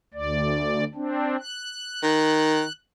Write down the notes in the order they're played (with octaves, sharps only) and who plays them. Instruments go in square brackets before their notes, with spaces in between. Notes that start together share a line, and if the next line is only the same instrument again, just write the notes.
[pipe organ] D2 D5
C4 D4
F#6
[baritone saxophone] D#3